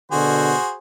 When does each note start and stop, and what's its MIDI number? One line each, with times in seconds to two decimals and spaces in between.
0.12 0.54 47
0.12 0.54 50
0.12 0.76 66
0.12 0.76 68
0.12 0.76 72